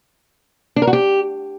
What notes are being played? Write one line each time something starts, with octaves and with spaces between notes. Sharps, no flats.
D4
A#4
F#4
G4